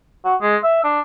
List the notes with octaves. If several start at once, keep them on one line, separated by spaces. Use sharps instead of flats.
F#4
G#3
E5
D4